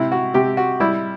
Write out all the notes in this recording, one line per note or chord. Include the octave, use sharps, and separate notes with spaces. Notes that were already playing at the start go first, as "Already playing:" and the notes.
Already playing: C3 E4
F#4
C3 G4
F#4
G3 E4